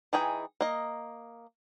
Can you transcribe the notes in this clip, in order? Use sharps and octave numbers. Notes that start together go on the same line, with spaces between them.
E3 D#4 G#4 G5
A#3 D#5